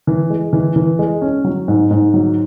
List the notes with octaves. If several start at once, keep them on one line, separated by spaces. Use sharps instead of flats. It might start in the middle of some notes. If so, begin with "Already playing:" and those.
E3
G#3
E3
E3
G#3
C#4
F#3
G#2
G#2
F#3